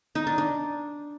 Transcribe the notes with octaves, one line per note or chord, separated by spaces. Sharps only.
D#4
D4
D4